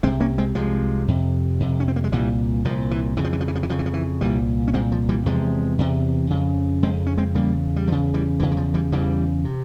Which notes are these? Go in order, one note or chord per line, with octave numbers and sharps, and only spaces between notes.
C2 C3 G#3 C4
A#3 C#4
G#3 C4
C2 C3 F3 G#3
F2 C3
F2 C3
C#4
C4
A#3
G#3
C2 A#2 E3 G3
C2 A#2 F3
E3
F2 C#3 E3
F3
E3
F3
E3
F3
E3
F2 C#3 F3
E3
F3
E3
C2 A#2 E3 G3
C#4
C2 A#2 G#3 C4
F3
E3 G3
E2 C3 F3 G#3
E2 C3
F2 C#3
F2 C#3 G#3 C4
C#4
G#3 C4
E2 C#3 G3 A#3
G3
E2 C#3 F3
E3 G3
E2 C#3 E3
E3
F3
E3 G3
E2 C#3 E3 G3
C3